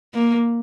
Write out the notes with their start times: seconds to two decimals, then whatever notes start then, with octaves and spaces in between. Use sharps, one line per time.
0.14 A#3